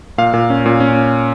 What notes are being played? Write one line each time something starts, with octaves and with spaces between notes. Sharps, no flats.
A#2 F5
A#2
C#4
A#2
C#4